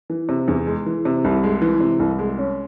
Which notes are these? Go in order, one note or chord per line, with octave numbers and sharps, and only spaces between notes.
E3
C3
E2
G#3
E3
C3
C2
G#3
E3
C3
C2
G#3
C#4